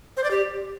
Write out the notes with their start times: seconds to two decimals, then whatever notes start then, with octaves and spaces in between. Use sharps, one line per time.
0.17 C5
0.24 D5
0.31 G4